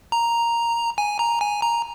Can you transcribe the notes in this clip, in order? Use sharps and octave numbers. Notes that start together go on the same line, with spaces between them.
A#5
G#5
A#5
G#5
A#5